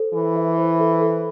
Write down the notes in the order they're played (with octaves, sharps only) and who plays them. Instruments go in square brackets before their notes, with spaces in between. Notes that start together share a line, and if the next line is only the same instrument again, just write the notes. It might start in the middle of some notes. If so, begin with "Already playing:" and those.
Already playing: [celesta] A4 C5
[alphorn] E3 [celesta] A4
[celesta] E5
C5
A4
A4